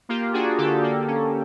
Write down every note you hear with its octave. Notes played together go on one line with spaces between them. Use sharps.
A#3 F4 G4
D4 F#4 G#4
D3 G4 A4
A#3
C#4